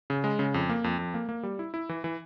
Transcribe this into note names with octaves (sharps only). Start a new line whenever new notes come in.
C#3
G#3
C#3
F2
A#3
F2
F2
A#3
A#3
G3
E4
E4
E3
E3